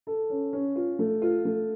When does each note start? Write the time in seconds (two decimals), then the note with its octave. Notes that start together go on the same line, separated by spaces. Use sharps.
0.07 A4
0.30 C#4
0.53 C#4
0.76 F4
0.99 A3
1.22 F4
1.45 A3